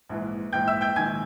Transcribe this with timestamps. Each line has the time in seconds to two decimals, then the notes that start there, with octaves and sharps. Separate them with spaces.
0.09 A#1 G#2 E3
0.53 A#1 G#2 E3 G5 G6
0.67 E5 E6
0.81 G5 G6
0.96 A#1 G#2 D#3 G#5 G#6